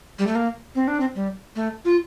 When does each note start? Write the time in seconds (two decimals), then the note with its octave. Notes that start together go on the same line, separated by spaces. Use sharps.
0.19 G3
0.27 A3
0.35 A#3
0.75 C4
0.88 D4
1.00 C4
1.15 G3
1.56 A3
1.85 F4